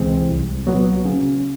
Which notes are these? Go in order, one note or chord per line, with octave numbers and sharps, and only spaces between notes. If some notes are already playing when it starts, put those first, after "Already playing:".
Already playing: C#2 C3 E3 G#3 C4
C2
A#2 F#3 B3
C#3